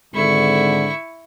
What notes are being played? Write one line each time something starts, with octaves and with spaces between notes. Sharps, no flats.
G#1 G#2 D3 E4 C#6